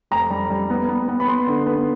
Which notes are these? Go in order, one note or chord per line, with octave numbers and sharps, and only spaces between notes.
F1 A#5
G3
G3
B3
B3
B3
B5
B3 C6
D3
B3